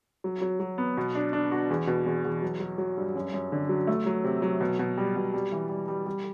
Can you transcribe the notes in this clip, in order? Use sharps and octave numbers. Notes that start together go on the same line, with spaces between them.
F#3
F#3
F#3
B3
B2
D4
D4
F#4
E2
B2
E2
E2
F#3
F#3
F#3
G2
F#2
F#2
D3
F#3
A3
F#3
C3
F#3
B2
B2
G3
B2
G3
E3
G3
G3
G3